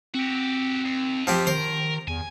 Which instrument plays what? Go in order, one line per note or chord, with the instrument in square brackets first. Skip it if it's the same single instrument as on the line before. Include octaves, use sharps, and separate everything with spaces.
[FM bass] C4 [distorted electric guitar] F#4 G4
[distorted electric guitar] D#2
[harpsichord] F3 C4 G4
[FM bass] D#3 [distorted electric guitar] A#4 [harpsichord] C5
[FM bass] E2 [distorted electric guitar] G#5